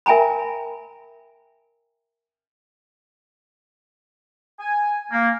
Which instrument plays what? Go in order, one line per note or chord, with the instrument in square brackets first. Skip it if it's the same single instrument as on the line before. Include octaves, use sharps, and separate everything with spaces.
[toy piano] A#4 E5 G5 G#5 A#5 B5
[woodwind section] G#5
A#3